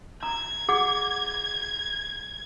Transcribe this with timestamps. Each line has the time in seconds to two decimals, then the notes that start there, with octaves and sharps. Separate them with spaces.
0.23 A#5 G#6
0.69 G#4 F#5 D6